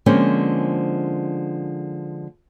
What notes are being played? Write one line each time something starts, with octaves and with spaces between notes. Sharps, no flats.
D3 F3 G#3 A#3 C4 C#4